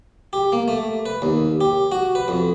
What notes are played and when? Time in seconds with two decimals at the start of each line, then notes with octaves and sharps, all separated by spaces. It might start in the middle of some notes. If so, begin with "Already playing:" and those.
0.33 G4
0.52 A#3
0.68 A3
1.06 B4
1.22 D#2
1.61 G4
1.92 F#4
2.15 B4
2.28 F2